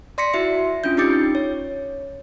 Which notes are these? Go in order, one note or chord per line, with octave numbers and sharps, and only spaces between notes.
D5 C6 A#6 B6 C#7
E4 F#4 E5 C#7
C#4 D4 F4 G6
C#4 D#4 G4 D6 A6 C#7
C#5